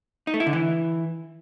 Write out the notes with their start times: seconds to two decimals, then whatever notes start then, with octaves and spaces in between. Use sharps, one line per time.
0.27 D#4
0.34 A3
0.40 E4
0.47 D3
0.53 E3